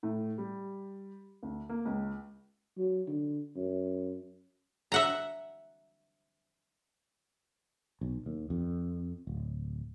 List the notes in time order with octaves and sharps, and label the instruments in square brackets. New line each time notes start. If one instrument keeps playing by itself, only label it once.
[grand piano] A2
G3
D2
A#3
C#2
[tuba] F#3
D3
F#2
[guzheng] E5 F#5 A#5
[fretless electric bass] B1
D#2
F2
D1